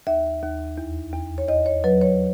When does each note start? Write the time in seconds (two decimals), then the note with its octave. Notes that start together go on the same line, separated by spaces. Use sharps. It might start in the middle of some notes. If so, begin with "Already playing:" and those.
0.07 D#2 E5
0.43 D#2
0.78 E2
1.13 E2
1.38 C#5
1.49 E2 D#5
1.66 C#5
1.84 F#3 B4
2.01 C#5